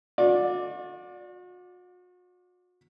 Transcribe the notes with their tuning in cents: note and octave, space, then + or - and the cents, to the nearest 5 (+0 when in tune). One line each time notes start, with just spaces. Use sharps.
F#4 -45 D5 +0